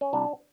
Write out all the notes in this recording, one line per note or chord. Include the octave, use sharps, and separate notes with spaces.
C#4
C2 D4